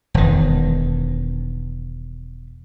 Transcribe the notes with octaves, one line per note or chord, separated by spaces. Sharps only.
E1 D#3